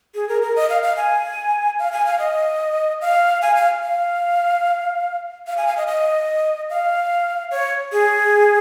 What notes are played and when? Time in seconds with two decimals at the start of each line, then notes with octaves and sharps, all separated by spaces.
0.15 G#4
0.29 A#4
0.42 A#4
0.56 D#5
0.70 F5
0.83 F5
0.97 G#5
1.79 F5
1.92 G#5
2.06 F5
2.19 D#5
3.01 F5
3.42 G#5
3.56 F5
3.83 F5
5.47 F5
5.57 G#5
5.67 F5
5.77 D#5
5.87 D#5
6.70 F5
7.51 C#5
7.92 G#4